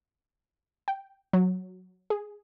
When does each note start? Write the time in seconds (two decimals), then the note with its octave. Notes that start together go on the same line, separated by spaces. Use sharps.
0.88 G5
1.33 F#3
2.10 G#4